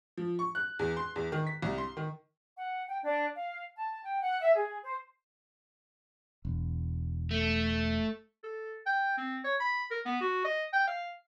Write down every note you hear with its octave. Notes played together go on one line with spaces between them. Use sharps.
F3
C#6
F#6
E2
C6
E2
D#3
B6
C2
C6
D#3
F#5
G5
D4
F5
A5
G5
F#5
E5
G#4
C5
E1
A3
A4
G5
C4
C#5
B5
A#4
B3
F#4
D#5
G5
F5